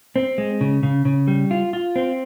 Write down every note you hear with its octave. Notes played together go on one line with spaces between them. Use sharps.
C4
G#3
C#3
C#3
C#3
G3
F4
F4
C4